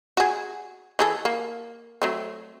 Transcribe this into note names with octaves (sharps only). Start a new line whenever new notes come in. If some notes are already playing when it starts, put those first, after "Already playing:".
F#4 G#4
E3 G#4 A4
A#3
F#3 A3 C4